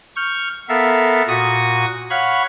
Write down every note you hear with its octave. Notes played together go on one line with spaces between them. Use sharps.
C#6 F6 G6
B3 A4 A#4 E5 F5
A#2 F#4 C#6 D#6
C#5 F5 F#5 B5 C#6